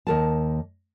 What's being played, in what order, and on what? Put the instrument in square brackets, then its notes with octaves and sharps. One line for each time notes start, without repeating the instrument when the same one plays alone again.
[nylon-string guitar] D#2 A#4 A5